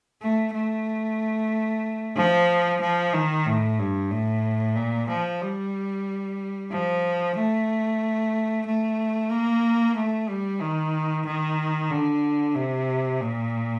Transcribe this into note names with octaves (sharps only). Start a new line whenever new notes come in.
A3
A3
F3
F3
D#3
A2
G2
A2
A#2
F3
G3
F3
A3
A3
A#3
A3
G3
D#3
D#3
D3
C3
A#2